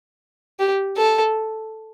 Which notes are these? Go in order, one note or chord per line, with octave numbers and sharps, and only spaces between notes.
G4
A4